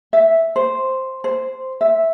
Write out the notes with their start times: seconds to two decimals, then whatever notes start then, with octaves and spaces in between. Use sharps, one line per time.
0.13 E5
0.56 C5
1.24 C5
1.81 E5